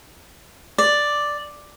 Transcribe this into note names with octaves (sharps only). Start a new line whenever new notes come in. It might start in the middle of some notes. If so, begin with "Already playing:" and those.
D5